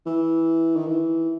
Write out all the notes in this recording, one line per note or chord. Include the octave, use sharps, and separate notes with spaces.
E3
D#3
E3